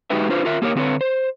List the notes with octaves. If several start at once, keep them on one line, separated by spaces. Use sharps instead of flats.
G#3 D#4 F#4 G4 B4 E5
D4 F4 B4 C5
F4 A#4 E5
A#3 G4 A#4 C#5
D3 C4 F#4 G#4 B4 C#5
C5